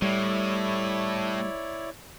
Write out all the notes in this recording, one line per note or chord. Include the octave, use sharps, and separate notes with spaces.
A2 G3 E4 C#5 D5